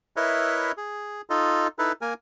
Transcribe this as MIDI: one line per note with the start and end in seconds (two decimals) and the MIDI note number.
0.16 0.72 64
0.16 0.72 70
0.16 0.72 71
0.16 0.72 73
0.16 0.72 75
0.16 0.72 76
0.77 1.21 68
1.30 1.68 63
1.30 1.68 65
1.30 1.68 69
1.30 1.68 75
1.79 1.92 63
1.79 1.92 64
1.79 1.92 69
1.79 1.92 71
2.01 2.14 58
2.01 2.14 70
2.01 2.14 80